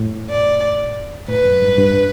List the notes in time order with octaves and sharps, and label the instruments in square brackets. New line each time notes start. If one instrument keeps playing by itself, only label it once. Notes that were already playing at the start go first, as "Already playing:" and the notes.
Already playing: [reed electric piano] A2
[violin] D5
[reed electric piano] A2 [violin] B4
[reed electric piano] F#2
G2
G2